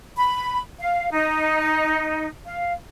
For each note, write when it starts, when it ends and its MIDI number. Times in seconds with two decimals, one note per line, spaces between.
0.17 0.59 83
0.79 1.09 77
1.11 2.27 63
2.45 2.73 77